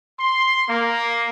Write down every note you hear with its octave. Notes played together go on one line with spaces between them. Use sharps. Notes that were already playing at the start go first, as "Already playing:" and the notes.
C6
A#3